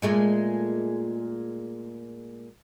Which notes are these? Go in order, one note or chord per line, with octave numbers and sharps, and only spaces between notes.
A#2 G#3 A3